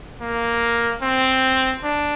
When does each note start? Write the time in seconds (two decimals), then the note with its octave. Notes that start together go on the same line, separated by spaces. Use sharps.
0.21 A#3
1.02 C4
1.83 D4